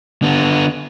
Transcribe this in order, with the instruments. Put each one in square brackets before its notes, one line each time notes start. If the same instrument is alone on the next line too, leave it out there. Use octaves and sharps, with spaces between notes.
[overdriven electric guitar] D3 B3